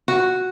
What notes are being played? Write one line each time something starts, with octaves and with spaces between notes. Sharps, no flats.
F#4